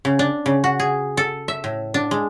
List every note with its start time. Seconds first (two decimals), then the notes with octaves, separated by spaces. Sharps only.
0.05 C#3
0.19 D4
0.46 C#3
0.64 F#4
0.80 G#4
1.17 A4
1.48 E5
1.64 A2
1.94 D4
2.11 G#3